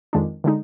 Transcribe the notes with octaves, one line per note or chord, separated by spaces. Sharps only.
F2 D#3 G#3 D4
D3 G#3 D#4